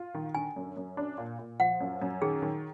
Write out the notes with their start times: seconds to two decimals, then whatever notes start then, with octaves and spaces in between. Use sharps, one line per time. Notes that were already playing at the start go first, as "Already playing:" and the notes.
Already playing: F4
0.14 D#3
0.35 D3 G#5
0.56 F#2
0.77 F#2
0.97 D4
1.18 A#2
1.39 A#2
1.60 F3 F#5
1.81 F#2
2.02 F#2
2.21 D#3 G#4
2.42 D#3